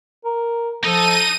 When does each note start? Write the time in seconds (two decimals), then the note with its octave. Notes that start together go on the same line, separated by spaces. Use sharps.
0.25 A#4
0.84 F3 D#4 A4 D#5 D#7